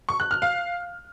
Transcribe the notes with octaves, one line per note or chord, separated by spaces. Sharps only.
C#6
F#6
F6
F5